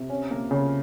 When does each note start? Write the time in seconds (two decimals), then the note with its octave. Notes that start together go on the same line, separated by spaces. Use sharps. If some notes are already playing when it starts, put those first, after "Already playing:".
Already playing: C3
0.10 C#4
0.31 A#3
0.51 C#3